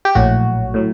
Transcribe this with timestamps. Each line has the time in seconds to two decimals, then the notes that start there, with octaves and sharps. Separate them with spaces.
0.05 G4
0.15 A#1 A2 F#3 F#4
0.74 A2 F#3